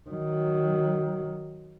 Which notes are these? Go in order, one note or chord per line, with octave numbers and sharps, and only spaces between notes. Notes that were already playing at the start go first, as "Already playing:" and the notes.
D#3 F#3